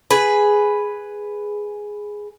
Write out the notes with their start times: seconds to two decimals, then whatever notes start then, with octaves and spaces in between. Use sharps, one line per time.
0.10 G#4 B4